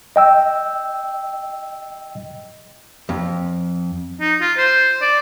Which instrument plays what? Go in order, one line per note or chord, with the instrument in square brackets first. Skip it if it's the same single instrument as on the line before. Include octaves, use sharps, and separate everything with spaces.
[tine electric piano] D#5 G5 E6
[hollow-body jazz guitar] F2
[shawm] D#4
F4
C5
D5